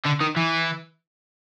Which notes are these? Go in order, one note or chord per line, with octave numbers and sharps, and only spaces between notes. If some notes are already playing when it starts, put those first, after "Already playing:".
D3
D#3
E3